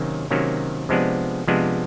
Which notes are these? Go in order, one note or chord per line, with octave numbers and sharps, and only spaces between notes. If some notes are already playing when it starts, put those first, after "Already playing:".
Already playing: C3 D#3 F#3 A#3 C#4
C3 D#3 F#3 A#3 C#4
C3 F3 G#3 B3 D4
C3 F3 G#3 B3 D4